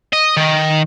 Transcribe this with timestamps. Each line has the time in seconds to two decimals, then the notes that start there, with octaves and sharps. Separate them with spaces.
0.13 D#5
0.37 D#3